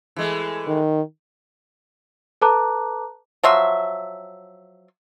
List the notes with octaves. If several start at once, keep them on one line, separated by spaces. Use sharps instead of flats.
E3 G#3 A3
D#3
A4 B4 A5 A#5 D6 F#6
F3 F#3 E5 C6